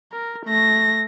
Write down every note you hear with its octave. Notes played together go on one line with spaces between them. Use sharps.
A#4
A3 A#6